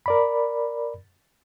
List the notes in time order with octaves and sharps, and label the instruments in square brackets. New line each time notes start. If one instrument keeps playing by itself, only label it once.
[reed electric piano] A#4 D5 B5